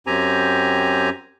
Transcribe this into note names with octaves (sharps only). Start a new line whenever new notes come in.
F#2 C4 G4 G#5 A#5